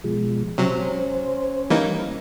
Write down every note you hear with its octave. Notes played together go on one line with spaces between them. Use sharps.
B2 F3 G#3
C3 F#3 C#4 C5
E3 G3 A#3 D#4